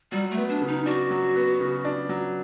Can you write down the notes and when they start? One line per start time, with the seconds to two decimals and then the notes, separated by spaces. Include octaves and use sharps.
0.12 F#3 G3
0.31 A3
0.38 B3
0.49 D4
0.61 C#3
0.67 D#4
0.86 D4 F#4
1.11 F#3
1.36 B3
1.60 C#3
1.85 D4
2.09 F#3